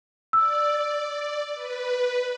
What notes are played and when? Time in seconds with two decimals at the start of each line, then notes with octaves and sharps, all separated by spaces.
0.33 D5 E6
1.54 B4